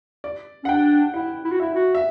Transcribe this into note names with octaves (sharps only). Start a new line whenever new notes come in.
D5
C#4 F#5
D4 G5
E4 F#5
E4
F#4
E4 E5
F#4
E5